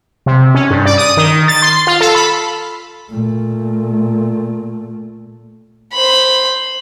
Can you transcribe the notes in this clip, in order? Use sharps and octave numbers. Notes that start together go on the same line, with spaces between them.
C3
C#4
G2
D5
D#6
D#3
A6
C6
F4
A4
B5
A#2 A3
C5 B5